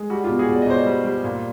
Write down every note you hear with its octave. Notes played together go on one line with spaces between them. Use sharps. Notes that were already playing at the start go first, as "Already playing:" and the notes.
Already playing: G#3
G3 F#4
F4 G4
B2
F#4 G#4
B2 D5
D#5
B2 C5 D5
G3
G3
A#2